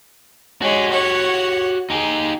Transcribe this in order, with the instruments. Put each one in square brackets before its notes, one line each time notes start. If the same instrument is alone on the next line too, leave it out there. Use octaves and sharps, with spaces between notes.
[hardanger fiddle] G#3 C#5 [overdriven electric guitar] F#4 G4
[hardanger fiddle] C#5 F#5
[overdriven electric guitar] D#4 G4 [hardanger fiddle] G#4